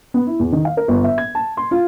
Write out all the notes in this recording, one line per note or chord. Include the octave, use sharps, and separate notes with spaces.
B3
E4
E2
D#3
F5
A#4
G1
E5
G#6
A5
C6
F4